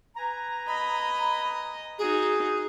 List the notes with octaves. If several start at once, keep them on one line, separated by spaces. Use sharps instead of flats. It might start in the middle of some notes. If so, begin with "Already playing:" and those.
B4 G#5 A#5
D#5 B5
D#4 F#4 G#4